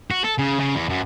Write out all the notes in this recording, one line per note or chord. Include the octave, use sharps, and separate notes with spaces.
F#4
A4
C#3
C#3
E2
F#2